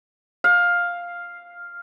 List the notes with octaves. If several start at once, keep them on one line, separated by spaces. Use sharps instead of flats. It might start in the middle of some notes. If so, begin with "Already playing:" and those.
F5